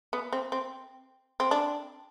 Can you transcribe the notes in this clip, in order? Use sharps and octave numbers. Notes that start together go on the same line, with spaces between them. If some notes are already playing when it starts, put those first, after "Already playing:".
B3
C4
C4
C4
D4